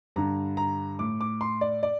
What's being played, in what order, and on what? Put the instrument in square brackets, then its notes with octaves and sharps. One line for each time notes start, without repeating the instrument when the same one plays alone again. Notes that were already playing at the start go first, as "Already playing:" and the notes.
[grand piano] G2 D3 A#5
A#5
A2 D6
D6
C6
D5
D5